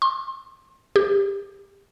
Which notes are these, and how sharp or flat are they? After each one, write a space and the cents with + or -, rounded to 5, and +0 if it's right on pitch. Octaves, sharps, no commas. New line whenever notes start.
C6 +30
G4 +15